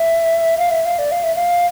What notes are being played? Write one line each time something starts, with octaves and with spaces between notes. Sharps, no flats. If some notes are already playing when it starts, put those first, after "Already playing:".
Already playing: E5
F5
E5
F5
D5
F5
E5
F5